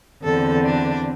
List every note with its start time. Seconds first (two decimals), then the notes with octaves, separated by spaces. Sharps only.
0.23 E2 D3 C4 A4
0.65 D4